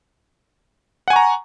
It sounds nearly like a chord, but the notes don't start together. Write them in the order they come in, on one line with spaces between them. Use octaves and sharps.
F#5 G#5 C#6 A#5